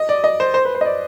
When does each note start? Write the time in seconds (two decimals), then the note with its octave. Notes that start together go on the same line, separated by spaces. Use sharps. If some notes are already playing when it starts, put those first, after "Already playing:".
Already playing: D#5
0.09 D5
0.24 D#5
0.40 C5
0.54 C5
0.65 B4
0.75 C5
0.81 D#5
0.85 D5